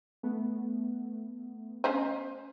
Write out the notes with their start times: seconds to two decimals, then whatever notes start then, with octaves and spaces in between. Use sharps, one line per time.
0.23 A3 B3
1.84 C#4 C5 D#5